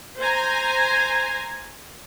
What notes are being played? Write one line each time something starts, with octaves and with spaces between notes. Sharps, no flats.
C5 G#5 A#5